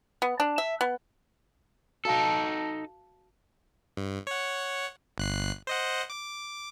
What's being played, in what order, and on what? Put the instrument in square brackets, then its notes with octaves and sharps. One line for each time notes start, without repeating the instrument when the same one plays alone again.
[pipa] B3
D4
E5
B3
[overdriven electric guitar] D#4 A4 [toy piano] F#4 F5 A5
[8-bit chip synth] G2
C#5 F#5
G1 F#6 C7
C5 D#5 F#5
D6